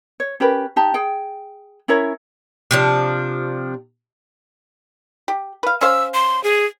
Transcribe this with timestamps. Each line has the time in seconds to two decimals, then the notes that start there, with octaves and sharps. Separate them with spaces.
0.20 C#5
0.40 C#4 G4 A#4 B4
0.76 D#4 G4 A5
0.94 G#4 G5
1.88 C#4 E4 A#4 C#5
2.71 C3 F3 D4
5.28 G4
5.63 B4 F5
5.81 C#4 C5 F5 E6
6.14 C6
6.44 G#4